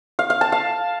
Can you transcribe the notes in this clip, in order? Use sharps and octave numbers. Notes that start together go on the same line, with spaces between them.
F5
F5
A5
F5